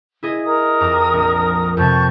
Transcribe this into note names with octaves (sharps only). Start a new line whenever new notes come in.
E4 G#4 D#5
A#4 D#6
F2 A#5 D6
A#1
F2 C3 A5 C#6 G6